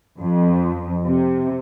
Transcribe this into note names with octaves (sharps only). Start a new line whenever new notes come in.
F2
C3